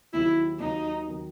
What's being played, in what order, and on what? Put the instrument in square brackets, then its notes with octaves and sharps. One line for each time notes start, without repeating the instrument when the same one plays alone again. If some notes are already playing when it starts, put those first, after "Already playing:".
[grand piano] D#2 D#3 F#3 [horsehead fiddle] E4
[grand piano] D#2 D#3 F#3 [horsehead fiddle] D#4
[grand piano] D#3 F#3